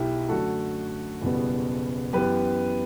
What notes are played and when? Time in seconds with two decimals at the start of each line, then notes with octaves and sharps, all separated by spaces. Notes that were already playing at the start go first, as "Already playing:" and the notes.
Already playing: B1 B2 F#3 E4 G4
0.29 F#2 D3 A3 F#4 A4
1.22 F#1 E2 B2 G3 B3
2.13 F#2 E3 B3 G4 B4